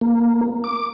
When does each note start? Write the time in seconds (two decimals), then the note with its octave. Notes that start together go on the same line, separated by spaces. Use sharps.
0.01 A#3
0.64 D6